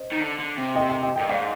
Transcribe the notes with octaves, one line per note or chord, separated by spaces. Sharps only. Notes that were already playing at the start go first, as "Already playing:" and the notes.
Already playing: C5 D#5
D#3
D3
D3
C3
D#5 G5
D#5 G5
D#5 G5
D#5 G5
G2
G#2 D5 F5